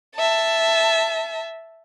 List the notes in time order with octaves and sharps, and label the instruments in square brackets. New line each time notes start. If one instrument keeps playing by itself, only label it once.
[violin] E5 A5